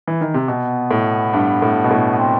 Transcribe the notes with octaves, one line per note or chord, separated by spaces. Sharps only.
E3
D#3
C3
B2 B3
A2
G2
A2
B2
A2
B3
C4